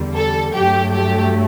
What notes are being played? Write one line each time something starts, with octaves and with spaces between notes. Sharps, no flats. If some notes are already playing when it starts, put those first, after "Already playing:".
Already playing: E2 D3 G3
A4
G2 F#3 A3 G4
G4